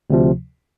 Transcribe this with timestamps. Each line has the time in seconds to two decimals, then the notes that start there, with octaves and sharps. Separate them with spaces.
0.10 D2 C3 F3